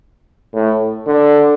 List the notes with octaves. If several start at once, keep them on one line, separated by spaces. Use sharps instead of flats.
A2
D3